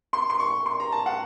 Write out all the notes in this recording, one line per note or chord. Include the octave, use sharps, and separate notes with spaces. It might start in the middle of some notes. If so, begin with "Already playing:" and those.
C6
C6
C#6
C6
A#5
A5
F#5